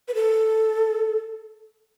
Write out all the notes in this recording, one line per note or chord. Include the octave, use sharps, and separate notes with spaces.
B4
A4